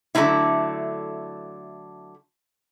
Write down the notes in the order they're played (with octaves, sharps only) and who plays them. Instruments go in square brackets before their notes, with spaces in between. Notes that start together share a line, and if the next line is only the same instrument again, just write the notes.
[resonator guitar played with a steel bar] D3 F#3 A3 C4 E4